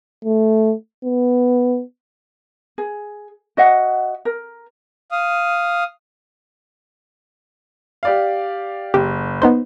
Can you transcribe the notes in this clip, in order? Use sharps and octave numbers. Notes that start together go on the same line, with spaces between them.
A3
B3
G#4
F#4 D#5 E5 F#5
A#4
F5 D#6
G4 D5 F5
F#1 G4
B3 D#4 C5